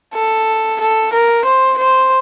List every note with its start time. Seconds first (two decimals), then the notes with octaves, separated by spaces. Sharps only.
0.14 A4
0.80 A4
1.13 A#4
1.45 C5
1.78 C5